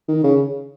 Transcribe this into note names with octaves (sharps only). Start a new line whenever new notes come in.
D#3
C#3